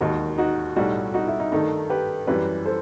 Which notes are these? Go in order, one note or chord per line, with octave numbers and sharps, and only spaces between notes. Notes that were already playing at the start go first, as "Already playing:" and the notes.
E1 D#2 D#3 D#4 F#4
D#4 F#4
B1 A2 G3 D#4 F#4
D#4 F#4
E4
D#4
G2 D#3 A3 D#4
G4 B4
F#2 E3 G3 G4 B4
A4 C5